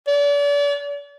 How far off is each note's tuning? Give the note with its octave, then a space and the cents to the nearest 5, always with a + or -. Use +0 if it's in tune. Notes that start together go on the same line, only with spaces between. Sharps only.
D5 -35